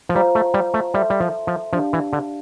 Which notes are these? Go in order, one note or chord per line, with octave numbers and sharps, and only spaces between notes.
F3
G3 F4 C5 F5 A#5
A3
G3
A3
G3 A4 E5 A5 C6
G3
F3
F3
F3 D4 G4 D5 F5 A5
E3
D3